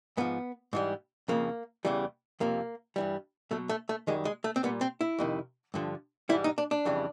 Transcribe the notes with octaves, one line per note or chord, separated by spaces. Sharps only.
G#2 F3 B3
G#2 E3 G3
F2 C#3 F3 A#3
E2 C#3 E3 G3
F2 C3 F3 A#3
G2 E3 G3
B2 F#3 A3
A3
A3
F#2 D#3 G3 G#3
G#3
A3
C4
A#2 G3 B3
C4
E4
F2 C3 D#3
G2 D3 F3
G#2 E3 G3 E4
D#4
D4
D4
F2 C#3 E3 G3